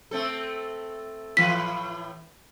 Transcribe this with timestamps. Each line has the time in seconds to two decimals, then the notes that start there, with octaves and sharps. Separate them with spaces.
0.11 A3 C4 A4
1.37 A2 E3 B4 B6